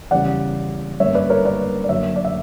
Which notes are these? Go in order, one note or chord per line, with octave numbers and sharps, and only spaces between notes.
E2 C#3 G3 C#4 D5 F#5
G2 D3 A#3 C#4 C#5 E5
B4 D5
A#4 C#5
B4 D5
D5
F#2 D3 F#3 A#3 C#5 E5
D5
E5